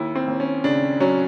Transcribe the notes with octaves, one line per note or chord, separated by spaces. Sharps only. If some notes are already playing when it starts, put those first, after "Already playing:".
Already playing: D#2 E4
C4
D#2
C#4
C#3 D4
F#3 C#4